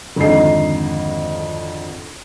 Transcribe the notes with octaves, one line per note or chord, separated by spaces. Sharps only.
G#1 F2 D3 D#4 D#5 C7